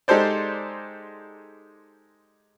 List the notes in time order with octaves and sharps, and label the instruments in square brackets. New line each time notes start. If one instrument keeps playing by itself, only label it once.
[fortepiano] G#3 D#4 G4 A4 C5 D5